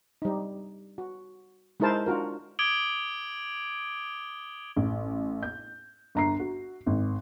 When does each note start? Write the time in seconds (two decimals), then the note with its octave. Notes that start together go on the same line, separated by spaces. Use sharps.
0.22 G3 D#4
0.98 F#4
1.80 G#3 D#4 E4 A#4 C5 A5
2.06 D4 F4 F#4 A#4
2.59 D6 D#6 G#6 D7 F#7 G7
4.76 A1
5.43 G6
6.15 G1 A#5 C7
6.40 F#4
6.86 G#1